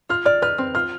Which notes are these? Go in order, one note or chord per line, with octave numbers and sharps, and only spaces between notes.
F4 F6
D5 F6
B4 F6
C4
F4 F6